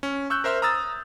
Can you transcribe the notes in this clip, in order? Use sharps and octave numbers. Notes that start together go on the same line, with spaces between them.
C#4
C#6 E6 F#6 G6
A#4 C5 E5 C6 F6
A#5 D#6 E6 A6